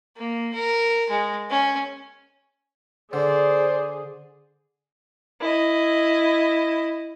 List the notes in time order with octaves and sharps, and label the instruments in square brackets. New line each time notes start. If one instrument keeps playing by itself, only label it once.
[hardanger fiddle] A#3
A#4
G#3
C#4
[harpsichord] D3 [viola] G#4 [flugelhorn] C5 [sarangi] D5
[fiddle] E4 D#5